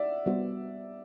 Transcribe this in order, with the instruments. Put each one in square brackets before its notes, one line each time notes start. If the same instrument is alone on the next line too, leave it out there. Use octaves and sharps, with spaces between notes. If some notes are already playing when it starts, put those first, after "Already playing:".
Already playing: [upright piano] D5 E5 F#5
[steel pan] G3 B3 F#4 C5